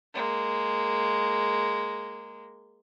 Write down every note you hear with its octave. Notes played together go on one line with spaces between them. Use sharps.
G#3 A#3